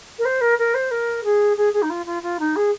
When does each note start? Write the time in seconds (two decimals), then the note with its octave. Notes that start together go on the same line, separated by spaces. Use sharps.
0.19 A#4
0.25 C5
0.41 A#4
0.58 A#4
0.74 C5
0.91 A#4
1.24 G#4
1.57 G#4
1.73 G#4
1.82 D#4
1.90 F4
2.06 F4
2.23 F4
2.39 D#4
2.56 G#4